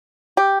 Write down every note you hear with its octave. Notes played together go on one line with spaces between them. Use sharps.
G4